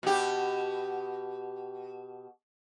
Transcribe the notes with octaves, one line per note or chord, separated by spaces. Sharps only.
B2 G4